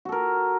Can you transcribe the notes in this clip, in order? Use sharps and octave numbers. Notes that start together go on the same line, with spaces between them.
F#4 A4 A#4